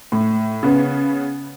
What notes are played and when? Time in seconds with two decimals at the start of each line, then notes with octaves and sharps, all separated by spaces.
0.12 A2
0.63 C#3 B3